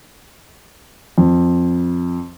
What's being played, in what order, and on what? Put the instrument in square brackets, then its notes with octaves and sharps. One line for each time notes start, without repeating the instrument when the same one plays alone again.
[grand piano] F2